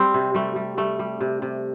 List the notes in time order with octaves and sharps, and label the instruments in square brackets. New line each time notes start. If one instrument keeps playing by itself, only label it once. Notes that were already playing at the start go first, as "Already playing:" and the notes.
Already playing: [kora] G3 C4
C3
G3 A3
G3
G3 A3
G3
C3
C3